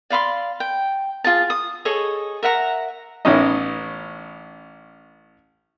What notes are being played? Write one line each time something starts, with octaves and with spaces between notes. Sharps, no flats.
D5 F5 B5 C6
G5
F4 G#4 A5
D#6
G#4 A4 C#5 D#5
A#4 E5 F#5 A#5
A1 E3 B3 C#4 D#4 D#5